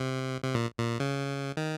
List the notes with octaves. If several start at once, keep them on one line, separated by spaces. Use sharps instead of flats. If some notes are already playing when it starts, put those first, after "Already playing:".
Already playing: C3
C3
A#2
A#2
C#3
D#3